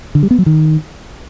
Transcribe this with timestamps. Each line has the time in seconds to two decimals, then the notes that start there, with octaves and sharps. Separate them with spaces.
0.15 D3
0.23 G3
0.31 B3
0.38 F#3
0.46 D#3